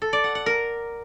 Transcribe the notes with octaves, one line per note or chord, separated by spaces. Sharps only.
A4
D5
F#5
F#5
A#4